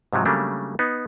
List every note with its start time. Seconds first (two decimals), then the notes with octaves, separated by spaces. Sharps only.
0.13 G#2 C3 F3 F#3
0.25 C#3 F#3 G3 A3 A#3 D4
0.79 B3 D#4